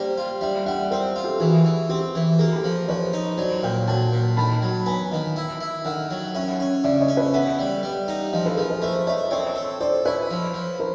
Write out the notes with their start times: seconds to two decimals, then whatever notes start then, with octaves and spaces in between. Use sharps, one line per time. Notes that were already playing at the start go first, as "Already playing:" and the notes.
Already playing: G3 A#3 C5 D5
0.18 F4
0.41 G3 D5 E5
0.66 G3 E5 F#5
0.91 C4 A#4 C5
1.16 F4
1.24 G4 A4
1.40 E3 F#4 G#4
1.65 E3
1.89 C4 G4
2.15 E3
2.39 A#3 F#4 G#4
2.56 G4 A4
2.64 F3
2.88 F3 B4 C#5
3.13 D#4
3.38 F#3 C5 D5
3.63 A#2 F5 G5
3.87 F#3 G5 A5
4.13 A#2
4.37 D#3 A5 B5
4.62 F#3
4.86 B3 G#5 A#5
5.11 D#3 D#5 F5
5.36 E4
5.61 E4
5.85 D#3 E5 F#5
6.11 F#3
6.35 C#4 E5 F#5
6.60 C#4
6.84 C#3 D5 E5
7.00 C#5 D#5
7.08 C#4
7.17 B4 C#5
7.33 B3 E5 F#5
7.59 G3
7.83 G3
8.08 D#4
8.32 F3 D#5 F5
8.45 A4 B4
8.57 F3 G#4 A#4
8.70 A4 B4
8.82 A3 A#4 C5
9.07 A3 C#5 D#5
9.31 C4 C#5 D#5
9.56 A4
9.80 A4 C5 D5
10.05 E4 B4 C#5
10.30 F3
10.54 F3
10.79 A#4 C5